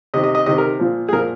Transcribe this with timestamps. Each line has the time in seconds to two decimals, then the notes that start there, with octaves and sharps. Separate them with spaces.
0.14 C3 D#5
0.16 D#3
0.24 D#5
0.35 D#5
0.46 C3 D#3 D#5
0.58 A#4
0.80 A#2 F3
1.09 G#4
1.13 A#2 F3 A#4